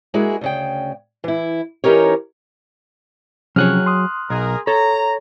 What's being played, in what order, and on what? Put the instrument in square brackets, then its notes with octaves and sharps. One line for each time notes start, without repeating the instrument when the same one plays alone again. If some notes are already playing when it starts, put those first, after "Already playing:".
[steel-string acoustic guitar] G#3 A#3 E4 F#4 G#4
D2 C#3 G5
E3 E4
E3 C#4 D#4 G4 A#4 C#5
[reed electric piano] C3 F3 C#4 [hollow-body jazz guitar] F#3 G#4 C#5 [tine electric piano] F6 F#6
[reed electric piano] C6 D#6
[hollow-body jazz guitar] B1 [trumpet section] G#4 A#4
[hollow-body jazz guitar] A4 [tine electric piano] C#5 [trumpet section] A#5